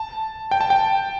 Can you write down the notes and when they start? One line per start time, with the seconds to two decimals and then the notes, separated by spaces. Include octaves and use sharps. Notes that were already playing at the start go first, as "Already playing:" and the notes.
Already playing: A5
0.51 G5
0.61 A5
0.70 G5